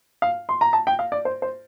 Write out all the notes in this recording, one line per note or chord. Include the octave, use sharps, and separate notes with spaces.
F5
C6
A#5
A5
G5
F5
D5
C5
C5